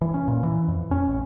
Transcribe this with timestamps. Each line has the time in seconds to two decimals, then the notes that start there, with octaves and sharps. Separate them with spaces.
0.01 E3
0.14 C#4
0.28 A#2
0.43 E3
0.68 F2
0.91 C#4
1.08 A1